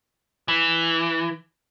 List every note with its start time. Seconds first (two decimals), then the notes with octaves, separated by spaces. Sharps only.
0.48 E3